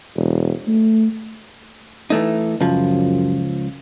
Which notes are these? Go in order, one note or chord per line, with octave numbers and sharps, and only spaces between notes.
E1
A3
E3 A3 D#4
C#2 F#2 F3